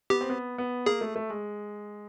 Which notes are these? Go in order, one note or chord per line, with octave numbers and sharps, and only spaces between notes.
B3 G4
C4
B3
B3
A#3 G#4
A3
A3
G#3